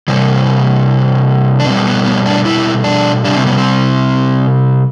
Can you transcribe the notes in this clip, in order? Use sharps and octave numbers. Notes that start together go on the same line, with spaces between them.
C3 E3 G3
D4
B2 G3 C4
B3
B3
D4
E4
D4
C3 G3 D4
C4
B3
C4